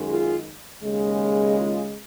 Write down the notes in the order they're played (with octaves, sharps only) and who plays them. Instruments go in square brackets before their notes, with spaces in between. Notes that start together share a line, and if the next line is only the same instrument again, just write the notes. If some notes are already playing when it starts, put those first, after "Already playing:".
Already playing: [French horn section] F#2 D#3 G#3
F4 G#4
D#2 C#3 G#3
F4 G#4